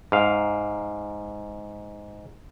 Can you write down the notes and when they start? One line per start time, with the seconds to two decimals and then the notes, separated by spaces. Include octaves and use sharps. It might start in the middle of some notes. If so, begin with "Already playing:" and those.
0.12 G#2 F5